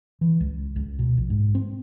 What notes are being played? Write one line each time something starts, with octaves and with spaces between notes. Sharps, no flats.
E3
C#2
C#2
B2
A#1
G#2
C4